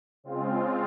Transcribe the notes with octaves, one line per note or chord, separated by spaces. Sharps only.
C#3 G#3 C4 F4